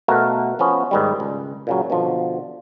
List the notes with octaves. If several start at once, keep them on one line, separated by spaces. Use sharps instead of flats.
B2 A3 A#4 F5 F#5
F3 B3 C#4
G#2 D#3 G3
C#2
A#2 C#3 F#3
B2 D3 F3